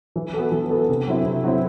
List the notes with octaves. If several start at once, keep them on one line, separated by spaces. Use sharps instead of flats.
E3
B3 F#4 A4
E3
B3 F#4 A4
C3
F#3 C4 E4
C3
F#3 C4 E4